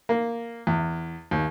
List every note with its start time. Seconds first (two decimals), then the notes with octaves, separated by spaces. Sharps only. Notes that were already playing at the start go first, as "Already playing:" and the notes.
0.09 A#3
0.67 E2
1.31 D#2